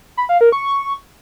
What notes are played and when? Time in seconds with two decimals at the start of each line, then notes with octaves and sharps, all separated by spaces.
0.17 B5
0.29 F5
0.41 A#4
0.52 C#6